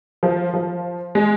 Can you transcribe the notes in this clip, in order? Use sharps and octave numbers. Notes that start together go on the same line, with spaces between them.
F3
F3
G#3